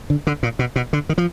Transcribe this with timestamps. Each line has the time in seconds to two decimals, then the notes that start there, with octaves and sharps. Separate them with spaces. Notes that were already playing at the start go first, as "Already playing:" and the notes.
0.10 D3
0.27 D3
0.43 A#2
0.59 B2
0.76 B2
0.93 D3
1.09 D#3
1.18 F3